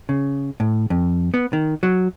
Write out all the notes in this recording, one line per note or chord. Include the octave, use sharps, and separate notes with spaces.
C#3
A2
F2
B3
D#3
F#3